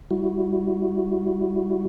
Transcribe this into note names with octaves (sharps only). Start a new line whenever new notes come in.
G3 E4 F#4